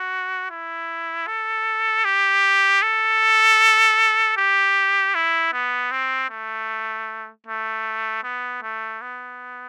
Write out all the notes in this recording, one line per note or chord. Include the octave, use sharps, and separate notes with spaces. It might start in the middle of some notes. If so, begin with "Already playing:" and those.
Already playing: F#4
E4
A4
G4
A4
G4
E4
B3
C4
A3
A3
B3
A3
B3